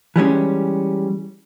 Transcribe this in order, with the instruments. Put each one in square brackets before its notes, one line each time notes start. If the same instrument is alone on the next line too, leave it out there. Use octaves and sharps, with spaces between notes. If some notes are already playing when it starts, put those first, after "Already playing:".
[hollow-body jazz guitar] E3 G3 G#3 C#4